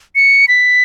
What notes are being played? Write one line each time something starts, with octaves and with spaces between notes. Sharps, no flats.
C#7
B6